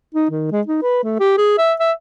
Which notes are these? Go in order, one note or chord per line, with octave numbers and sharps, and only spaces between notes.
D#4
D#3
G#3
D#4
B4
A3
G4
G#4
E5
E5